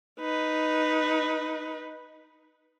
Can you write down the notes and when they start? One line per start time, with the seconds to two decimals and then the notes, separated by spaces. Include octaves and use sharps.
0.20 D#4 B4